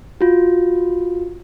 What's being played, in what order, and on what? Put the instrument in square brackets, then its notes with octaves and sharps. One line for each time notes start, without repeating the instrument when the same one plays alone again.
[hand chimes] F4 F#4